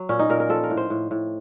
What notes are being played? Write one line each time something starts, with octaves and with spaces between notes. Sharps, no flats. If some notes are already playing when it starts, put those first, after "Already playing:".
Already playing: F#3
A#2 C#4
D#4
A#2 A#4
A#4
F3 A4
A#4
A2
C5
A2
A2